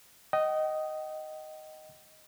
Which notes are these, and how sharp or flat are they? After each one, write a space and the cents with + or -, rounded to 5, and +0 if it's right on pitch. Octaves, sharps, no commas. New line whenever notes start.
D#5 +0 G5 -45